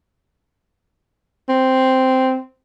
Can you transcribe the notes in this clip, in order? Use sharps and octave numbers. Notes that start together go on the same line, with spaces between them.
C4